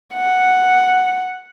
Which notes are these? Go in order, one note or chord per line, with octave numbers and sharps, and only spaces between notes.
F#5